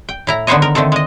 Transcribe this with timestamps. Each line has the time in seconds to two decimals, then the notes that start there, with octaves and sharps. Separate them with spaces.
0.09 G5
0.27 A2 E4 A#5
0.47 D3 D#3 B3 C5 C#5 D#5
0.62 A#4
0.75 D3 D#3 A3 C4 A4
0.92 G#3 D#5